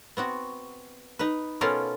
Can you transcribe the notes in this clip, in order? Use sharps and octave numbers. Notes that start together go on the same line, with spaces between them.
B3 C4 F#4
D#4 B4
B2 B3 C#4 F4 A4 A#4